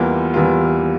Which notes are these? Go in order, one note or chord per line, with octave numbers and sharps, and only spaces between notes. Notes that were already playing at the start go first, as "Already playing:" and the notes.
Already playing: E2 E3 G3 A#3 F4
E2 E3 G3 A#3 F4